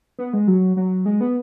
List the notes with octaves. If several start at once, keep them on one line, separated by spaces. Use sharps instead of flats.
B3
G#3
F#3
F#3
G#3
B3